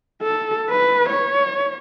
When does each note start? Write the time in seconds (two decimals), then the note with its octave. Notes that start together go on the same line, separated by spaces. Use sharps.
0.22 A4
0.70 B4
1.09 C#5